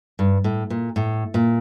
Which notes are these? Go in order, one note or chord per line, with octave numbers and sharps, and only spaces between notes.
G2
A2
A#2
A2
A#2